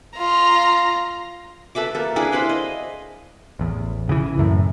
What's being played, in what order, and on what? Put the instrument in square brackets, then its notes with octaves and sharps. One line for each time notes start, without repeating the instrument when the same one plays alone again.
[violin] F4 A#5
[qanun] A4 B4 E5 D6
A#3 A4
D4 E4 G#4 B4
C5 F5 B5 C6
D#5
[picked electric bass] A1 E2
C#3 E3
C#2 F#2 A2